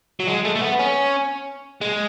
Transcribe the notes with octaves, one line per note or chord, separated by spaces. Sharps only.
F#3
G#3
A3
A3
B3
C#4
G#3